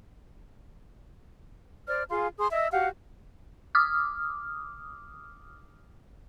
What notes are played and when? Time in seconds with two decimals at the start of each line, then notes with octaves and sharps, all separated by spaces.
1.88 C5 D5 F6
2.10 F4 G#4 F5 C6
2.38 G#4 C6 D#6
2.51 D#5 E5 E6
2.72 F#4 G4 F5 F#5
3.75 D6 D#6 F6